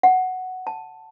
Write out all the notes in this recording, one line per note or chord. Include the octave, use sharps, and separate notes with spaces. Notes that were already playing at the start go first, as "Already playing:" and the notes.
F#5
A5